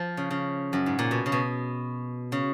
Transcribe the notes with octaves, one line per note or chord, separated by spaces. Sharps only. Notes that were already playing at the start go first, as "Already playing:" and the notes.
Already playing: F3
C#3
C#3
F#2
G#2
A#2
B2
C#3
B2
C#3